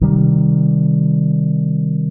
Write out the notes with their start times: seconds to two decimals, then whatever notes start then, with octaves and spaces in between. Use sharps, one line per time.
0.01 C3 D#3 G3